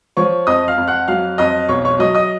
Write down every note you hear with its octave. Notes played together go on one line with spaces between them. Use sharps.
F3 C#5 C#6
F2 D#5 D#6
F5 F6
F2
F#5 F#6
F#3 F5 F6
F2 D#5 D#6
B1 C#5 C#6
C#5 C#6
F#3 D#5 D#6
D#5 D#6